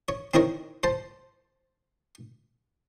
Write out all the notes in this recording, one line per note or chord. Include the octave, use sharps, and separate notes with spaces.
C#5
C4 D#4 E4 A#4 C#5
C5 A5